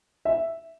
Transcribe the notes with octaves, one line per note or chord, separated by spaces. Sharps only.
E5